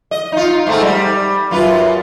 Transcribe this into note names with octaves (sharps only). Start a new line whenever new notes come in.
D#5
D#4 F4
G#2 A3 C4
G3
F#2 F4 B4